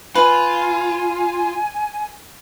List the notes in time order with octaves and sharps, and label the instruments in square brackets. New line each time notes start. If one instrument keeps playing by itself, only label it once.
[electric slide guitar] F4 [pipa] B4 [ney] G#5